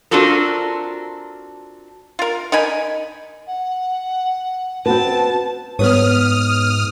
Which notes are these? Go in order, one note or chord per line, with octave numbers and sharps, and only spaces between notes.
C4 D4 F4 F#4 A4 A#4
F4 A#4
D#4 A#4 G#5 B5
F#5
C4 F#4 B4 A5
G#2 B3 B4 C#5 D#6 F6